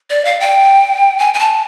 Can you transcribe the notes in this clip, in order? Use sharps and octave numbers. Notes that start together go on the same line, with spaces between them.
D5
F5
G5
G#5
G#5
A5